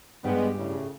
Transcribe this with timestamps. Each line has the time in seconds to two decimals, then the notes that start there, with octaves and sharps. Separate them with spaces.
0.24 G2 G3 G#3 B3 G4
0.57 A2 C#3